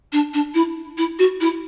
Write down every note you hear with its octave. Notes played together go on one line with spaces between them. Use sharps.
D4
D4
E4
E4
F#4
E4